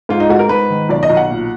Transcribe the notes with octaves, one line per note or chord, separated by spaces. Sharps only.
G#2 F4
D#4
G#2 F#4
A#4
G#2 B4
D#3
B1 D5
D#5
B1
F#5
A#2